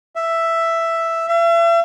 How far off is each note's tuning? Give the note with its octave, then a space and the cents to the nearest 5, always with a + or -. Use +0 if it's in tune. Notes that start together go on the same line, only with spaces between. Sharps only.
E5 +5
E5 +40